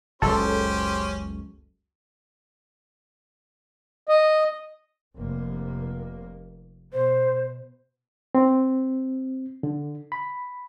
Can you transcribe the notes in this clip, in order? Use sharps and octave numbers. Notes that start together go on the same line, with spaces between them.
F#1 C#2 C#4 G4 A4 C5
D#5
F1 A#3
B2 C5
C4
D3
B5